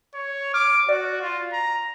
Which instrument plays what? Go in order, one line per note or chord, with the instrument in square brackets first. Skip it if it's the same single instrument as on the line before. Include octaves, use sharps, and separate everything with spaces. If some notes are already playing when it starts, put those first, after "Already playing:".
[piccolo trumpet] C#5
[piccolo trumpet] D6 [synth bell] F6
[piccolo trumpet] F#4 [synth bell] D5
[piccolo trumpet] F4
A#5